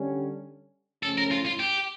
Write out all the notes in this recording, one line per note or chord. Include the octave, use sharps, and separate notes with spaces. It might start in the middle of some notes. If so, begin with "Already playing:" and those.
Already playing: D3 G3 C#4
C#3 F3 A3 C#4 A4
A#4
F4
F4
G4